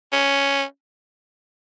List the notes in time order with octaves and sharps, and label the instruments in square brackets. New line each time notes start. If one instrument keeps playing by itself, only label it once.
[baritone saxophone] C#4